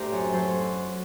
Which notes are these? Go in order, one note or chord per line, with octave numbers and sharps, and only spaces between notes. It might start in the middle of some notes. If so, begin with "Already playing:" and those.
Already playing: A2 D4 G4 A#4 C5
F#2
F#3 A4 C5